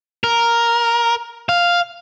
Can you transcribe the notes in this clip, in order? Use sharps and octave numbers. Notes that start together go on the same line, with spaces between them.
A#4
F5